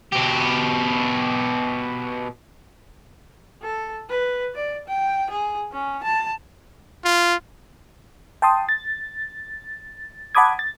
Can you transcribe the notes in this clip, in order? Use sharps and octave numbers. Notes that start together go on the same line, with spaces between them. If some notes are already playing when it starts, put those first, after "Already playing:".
B2 G4
A4
B4
D5
G5
G#4
C#4
A5
F4
G5 A5 C6 D#6
A6
F#5 A5 B5 D6 D#6 G#6
A6